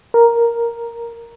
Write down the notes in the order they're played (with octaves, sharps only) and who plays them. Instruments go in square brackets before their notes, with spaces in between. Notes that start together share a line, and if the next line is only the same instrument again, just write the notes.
[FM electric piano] A#4